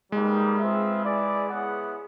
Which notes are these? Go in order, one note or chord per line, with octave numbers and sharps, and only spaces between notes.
G3 G#3 A#3 D#4 G4 B4
C4 F4 G#4 B4 E5
E4 G#4 B4 D5
B3 E4 G#4 C#5 F#5